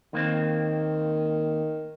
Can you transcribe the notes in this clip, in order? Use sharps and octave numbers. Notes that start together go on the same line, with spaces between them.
D#2 D#3 A#3 C4